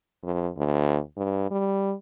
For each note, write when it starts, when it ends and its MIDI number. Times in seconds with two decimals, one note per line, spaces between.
0.23 0.49 41
0.57 0.99 38
1.17 1.49 43
1.51 1.94 55